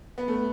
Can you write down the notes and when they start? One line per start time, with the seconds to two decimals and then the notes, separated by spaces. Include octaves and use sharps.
0.18 B3
0.28 A3